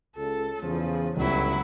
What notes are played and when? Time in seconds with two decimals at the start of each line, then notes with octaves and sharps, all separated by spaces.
0.16 C#2 A4
0.62 E2 C#3 F3
1.17 G1 C#2 F#3 G3 E4